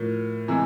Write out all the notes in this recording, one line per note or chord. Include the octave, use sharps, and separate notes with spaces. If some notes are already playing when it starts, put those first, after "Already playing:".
Already playing: A2 F3 A#3
C3 E3 G#3